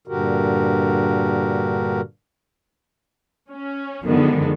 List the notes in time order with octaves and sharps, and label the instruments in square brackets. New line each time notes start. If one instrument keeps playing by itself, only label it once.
[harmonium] G2 A#2 D3 F#4 G4 A#4
[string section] C#4
F#2 D3 D#3 F3 G#3 B3